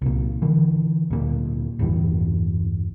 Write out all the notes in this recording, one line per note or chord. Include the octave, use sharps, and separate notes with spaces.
C2 A#2
D3 E3
D2 A#2
G1 E2 A2 E3